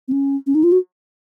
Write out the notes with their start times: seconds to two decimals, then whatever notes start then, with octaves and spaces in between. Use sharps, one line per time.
0.08 C4
0.12 C#4
0.47 C#4
0.55 D#4
0.63 F4
0.72 F#4